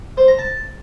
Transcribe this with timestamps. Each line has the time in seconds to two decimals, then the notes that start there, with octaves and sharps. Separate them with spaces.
0.17 C5
0.28 A#5
0.39 A5